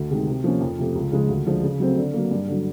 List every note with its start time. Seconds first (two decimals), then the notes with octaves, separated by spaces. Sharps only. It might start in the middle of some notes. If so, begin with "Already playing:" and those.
Already playing: D2
0.10 C3 D#3 G#3
0.27 C3
0.44 F3 A#3 C#4
0.61 F2
0.78 C3 F3 A3
0.95 C#2
1.12 C#3 F3 G#3
1.29 D2
1.46 D3 F3 G#3
1.63 C#3
1.80 F#3 A3 C4
1.97 D3
2.14 F#3 A#3
2.31 G2
2.48 D3 F#3